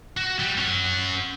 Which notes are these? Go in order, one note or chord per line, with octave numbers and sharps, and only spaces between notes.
F#4
G3
C#4 F#5